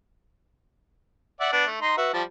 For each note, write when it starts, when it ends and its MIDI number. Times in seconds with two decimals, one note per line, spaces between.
1.40 1.51 74
1.40 1.51 76
1.40 1.51 78
1.53 1.65 59
1.53 1.65 62
1.66 1.79 57
1.81 1.95 63
1.81 1.95 82
1.81 1.95 84
1.97 2.09 66
1.97 2.09 71
1.97 2.09 76
2.13 2.23 53
2.13 2.23 55
2.13 2.23 81